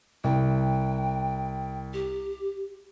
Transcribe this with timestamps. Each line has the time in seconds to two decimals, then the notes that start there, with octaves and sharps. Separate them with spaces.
0.24 C2 G5
1.93 G4